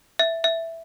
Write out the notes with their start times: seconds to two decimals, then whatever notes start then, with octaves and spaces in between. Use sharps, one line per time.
0.19 E5
0.44 E5